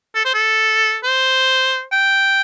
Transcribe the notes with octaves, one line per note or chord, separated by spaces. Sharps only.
A4
C5
A4
C5
G5